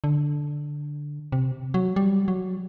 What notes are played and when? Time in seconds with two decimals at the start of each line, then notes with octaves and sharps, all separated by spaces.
0.04 D3
1.32 C3
1.74 F#3
1.96 G3
2.28 F#3